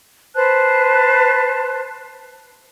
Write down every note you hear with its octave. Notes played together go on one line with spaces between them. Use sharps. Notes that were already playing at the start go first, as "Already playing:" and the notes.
B4 C5 A5 F#6